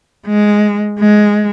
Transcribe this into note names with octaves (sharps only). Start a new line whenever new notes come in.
G#3
G#3